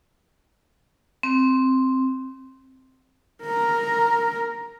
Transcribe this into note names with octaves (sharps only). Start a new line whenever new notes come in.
C4
A#4 A#5